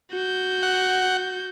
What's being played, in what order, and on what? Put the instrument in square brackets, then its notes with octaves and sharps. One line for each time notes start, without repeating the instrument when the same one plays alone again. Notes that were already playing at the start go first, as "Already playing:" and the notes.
[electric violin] F#4 G6
[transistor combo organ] F#5